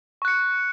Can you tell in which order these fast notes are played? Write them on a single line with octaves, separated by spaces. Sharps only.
C#6 F#6 C#7